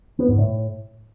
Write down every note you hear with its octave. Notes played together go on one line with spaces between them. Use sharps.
B3
G#2
A2